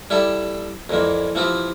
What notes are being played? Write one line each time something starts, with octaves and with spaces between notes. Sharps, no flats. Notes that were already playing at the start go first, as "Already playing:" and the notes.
G3 E4 G4 A4 D5
F2 A#2 E3 A#3
E3 F3 C4 F4 G4